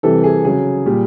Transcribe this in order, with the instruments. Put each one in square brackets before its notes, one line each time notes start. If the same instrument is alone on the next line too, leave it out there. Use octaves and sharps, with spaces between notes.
[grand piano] C3 E3 G3 A4
G#4
C#3 F#3 G#4
A#2 G3